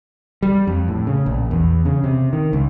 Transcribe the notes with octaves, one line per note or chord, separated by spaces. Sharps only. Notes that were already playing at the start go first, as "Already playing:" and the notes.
G3
F2
A2
C#3
A#1
E2
C#3
C3
D#3
C#2